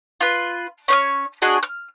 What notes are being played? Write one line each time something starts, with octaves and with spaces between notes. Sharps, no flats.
F4 B4
C#4 C#5 F6
D4 F#4 G#4 D#5
F6